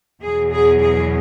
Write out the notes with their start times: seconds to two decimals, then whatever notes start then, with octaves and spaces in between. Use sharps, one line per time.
0.22 E2 B2 F#3 G#4
0.51 G#4
0.79 G#4